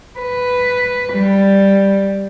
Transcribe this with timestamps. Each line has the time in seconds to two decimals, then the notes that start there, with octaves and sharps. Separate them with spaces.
0.19 B4
1.14 G3